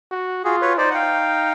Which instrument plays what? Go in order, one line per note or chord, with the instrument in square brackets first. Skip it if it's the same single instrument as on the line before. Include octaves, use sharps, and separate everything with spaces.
[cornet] F#4
[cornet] F4 [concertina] F#4 G#4
[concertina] B4 C#5
[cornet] D#4 [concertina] C5 D5
[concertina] F#5
F5 G5